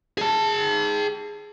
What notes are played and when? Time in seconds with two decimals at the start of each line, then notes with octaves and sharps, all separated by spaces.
0.18 G#4 A5